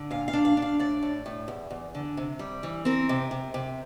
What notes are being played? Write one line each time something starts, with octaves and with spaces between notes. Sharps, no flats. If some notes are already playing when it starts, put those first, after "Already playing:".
Already playing: D3
A#2 F5
F5
D4
F5
D4
F5
A2 D5
A2
A2
E2
E2
D3
C3
G3
E3
C4 A#4
C3
C3
C3